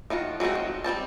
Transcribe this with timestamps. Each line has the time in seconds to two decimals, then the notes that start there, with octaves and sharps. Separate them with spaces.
0.10 D#3 F3 F4 F#4
0.40 F#3 G#3 A3 C4 F#4
0.55 D#3
0.84 G3 C4 C5 A5